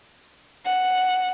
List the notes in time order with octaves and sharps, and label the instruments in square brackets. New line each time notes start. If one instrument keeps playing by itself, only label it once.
[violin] F#5